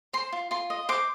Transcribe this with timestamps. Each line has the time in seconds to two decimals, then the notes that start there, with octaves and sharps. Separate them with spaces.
0.13 C5 C6
0.32 F4
0.51 F4 C6
0.70 D#5
0.89 C5 D6